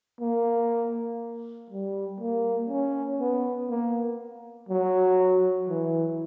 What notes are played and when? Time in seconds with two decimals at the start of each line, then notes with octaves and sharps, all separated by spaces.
0.21 A#3
1.70 G3
2.20 A#3
2.69 C#4
3.20 B3
3.70 A#3
4.69 F#3
5.69 E3